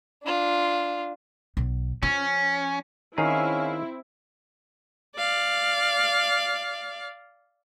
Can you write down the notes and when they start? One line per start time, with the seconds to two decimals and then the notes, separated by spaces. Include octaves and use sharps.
0.23 D4 F4
1.57 B1
2.03 F3 C#4
3.18 D#3 C4 C#4 E4 G#4 F5 A#5
5.17 D5 F5